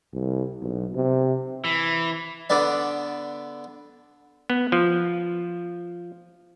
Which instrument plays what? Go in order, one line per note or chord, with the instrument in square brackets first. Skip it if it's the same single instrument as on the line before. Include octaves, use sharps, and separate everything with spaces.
[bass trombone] C2
B1
C3
[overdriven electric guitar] E3
[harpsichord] D3 B3 D5
[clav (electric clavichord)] B3
F3